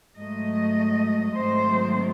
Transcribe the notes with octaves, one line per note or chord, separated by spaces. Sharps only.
G#2 F#3 A3 D#5
G#2 D#3 F#3 A3 C4 C5